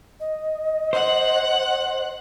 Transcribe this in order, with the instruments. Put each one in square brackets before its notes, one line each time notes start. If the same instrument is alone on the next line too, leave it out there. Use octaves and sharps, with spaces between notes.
[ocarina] D#5
[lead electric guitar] C5 [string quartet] F#5 F#6